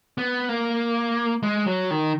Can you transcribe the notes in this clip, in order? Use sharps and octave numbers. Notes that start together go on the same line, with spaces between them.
B3
A#3
G#3
F#3
D#3